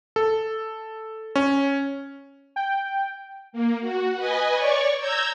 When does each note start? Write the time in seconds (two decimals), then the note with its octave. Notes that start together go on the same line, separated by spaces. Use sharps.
0.16 A4
1.36 C#4
2.56 G5
3.53 A#3
3.81 F#4
4.17 B4 D#5 G#5
4.53 C#5 D5 C#6
4.99 A#5 E6 G6 G#6